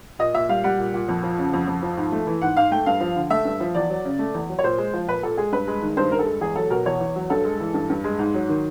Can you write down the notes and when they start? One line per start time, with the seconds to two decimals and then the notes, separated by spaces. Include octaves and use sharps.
0.19 A#2 D#5
0.34 A#2 E5
0.49 G3 F5
0.64 G3 F#5
0.79 A#2
0.94 A#2
1.08 F2
1.23 F3
1.38 C#3
1.53 F2
1.67 F2
1.82 F3
1.97 G#2
2.12 A3
2.27 E3
2.41 G#2 F#5
2.57 G#2 F5
2.71 A3 G5
2.86 G2 F5
3.00 F3
3.16 D3
3.30 A3 E5
3.45 G2
3.60 F3
3.74 E2 D5
3.90 F#3
4.05 C#3
4.19 A3
4.34 E2
4.49 F#3
4.59 C#5
4.64 A#2 C5
4.78 G#3
4.93 F3
5.07 A#2 B4
5.23 A#2 A4
5.37 G#3 G#4
5.52 G2 B4
5.67 G#3
5.82 D#3
5.97 G2 C5
6.11 G2 A#4
6.19 A4
6.26 G#3
6.41 E2 G#4
6.56 F#3 A4
6.70 B2 A#4
6.86 E2 C#5
7.00 E2
7.16 F#3
7.30 G2 A4
7.45 G#3
7.60 E3
7.74 G2
7.90 G2
8.04 G#3
8.19 G#2
8.34 F#3
8.49 D#3